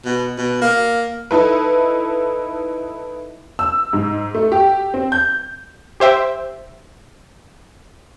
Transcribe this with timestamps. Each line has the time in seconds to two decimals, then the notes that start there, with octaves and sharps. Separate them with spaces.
0.05 B2
0.38 B2
0.62 A#3
1.31 D#4 E4 A4 B4
3.59 E6
3.93 G#2
4.35 A3
4.52 G4
4.94 C4
5.12 G6
6.00 G4 C5 E5 G5